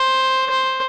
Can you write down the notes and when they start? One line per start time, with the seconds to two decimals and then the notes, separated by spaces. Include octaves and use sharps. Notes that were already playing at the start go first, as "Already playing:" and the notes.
Already playing: C5
0.50 C5